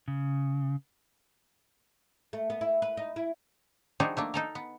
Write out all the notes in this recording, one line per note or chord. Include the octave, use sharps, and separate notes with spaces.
C#3
A3
B3
E4
B4
D#4
E4
F3 G3 D4 D#4 F#4 G#4
A3 A#3 D4
D#4 A4 A#4
B3